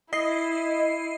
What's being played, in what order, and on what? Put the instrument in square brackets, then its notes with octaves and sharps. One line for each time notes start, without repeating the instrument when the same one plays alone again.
[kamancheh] E4 [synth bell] D#5 C7